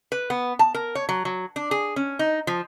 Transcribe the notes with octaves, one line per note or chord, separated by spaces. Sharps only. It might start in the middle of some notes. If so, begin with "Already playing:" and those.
B4
B3
A5
A#4
C#5
F#3
F#3
D4
G#4
C#4
D#4
F3